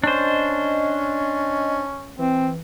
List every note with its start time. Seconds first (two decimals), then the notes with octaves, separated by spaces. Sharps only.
0.04 C#4 D4 C5 D#5
2.18 E3 C4